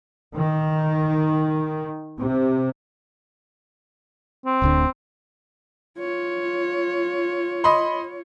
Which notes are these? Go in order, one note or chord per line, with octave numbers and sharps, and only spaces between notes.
D#3
C3
C4
D1 D2 D3
F4 C#5
D#5 B5 C6